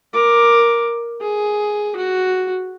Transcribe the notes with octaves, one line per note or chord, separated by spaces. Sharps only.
A#4 D6
G#4
F#4